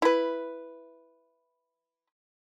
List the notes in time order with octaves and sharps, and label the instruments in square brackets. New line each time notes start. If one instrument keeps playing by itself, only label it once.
[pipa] E4 B4